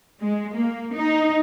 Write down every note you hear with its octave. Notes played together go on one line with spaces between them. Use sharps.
G#3
A#3
D#4